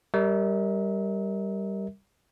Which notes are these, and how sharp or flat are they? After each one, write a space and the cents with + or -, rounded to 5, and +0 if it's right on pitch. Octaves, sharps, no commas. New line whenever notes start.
G3 +0 A#4 +0 E5 -40